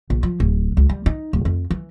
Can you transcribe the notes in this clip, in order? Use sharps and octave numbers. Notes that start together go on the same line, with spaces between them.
A#1
F3
D1
C#2
G3
D#4
D1
F2
E3